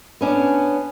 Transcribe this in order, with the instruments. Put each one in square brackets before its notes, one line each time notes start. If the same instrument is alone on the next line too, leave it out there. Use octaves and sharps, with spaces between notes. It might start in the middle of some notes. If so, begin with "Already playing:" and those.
[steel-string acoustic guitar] B3 C#4 D4